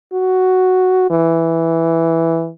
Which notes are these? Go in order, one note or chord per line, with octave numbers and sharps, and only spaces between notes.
F#4
E3